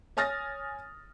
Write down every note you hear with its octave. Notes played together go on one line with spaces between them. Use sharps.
C#5 G#5 D#6 F6 A6 A#6